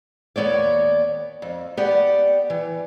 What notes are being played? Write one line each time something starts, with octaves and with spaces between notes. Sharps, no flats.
D#2 F3 B3 C#5 D5
F2
B3 G4 D5 F#5
E3